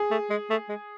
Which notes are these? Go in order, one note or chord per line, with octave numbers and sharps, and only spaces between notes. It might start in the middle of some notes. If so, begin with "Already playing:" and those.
Already playing: G#4
A3
G#3
A3
G#3